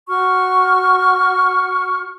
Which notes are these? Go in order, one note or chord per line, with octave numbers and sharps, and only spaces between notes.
F#4 C#6 F6